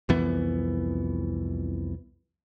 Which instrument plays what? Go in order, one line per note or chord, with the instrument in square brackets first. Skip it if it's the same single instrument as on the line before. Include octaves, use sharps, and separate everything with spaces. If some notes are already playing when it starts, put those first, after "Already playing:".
[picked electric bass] C2 F2 E3 B3